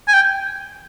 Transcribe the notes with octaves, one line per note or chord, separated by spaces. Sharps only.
G#5
G5